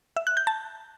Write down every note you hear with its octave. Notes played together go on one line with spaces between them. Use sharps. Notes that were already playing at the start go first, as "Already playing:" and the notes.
E5
F#6
G6
A5